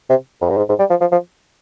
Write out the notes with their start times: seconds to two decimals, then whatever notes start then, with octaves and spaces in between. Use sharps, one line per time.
0.10 C3
0.42 F2
0.50 G2
0.57 G#2
0.69 G#2
0.79 G3
0.90 F3
1.01 F3
1.12 F3